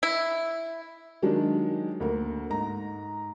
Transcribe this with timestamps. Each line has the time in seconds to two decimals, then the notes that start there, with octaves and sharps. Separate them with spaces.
0.03 E4
1.22 D#3 F#3 G#3 D4
2.00 D2 A#3 A#4
2.50 G#2 A#5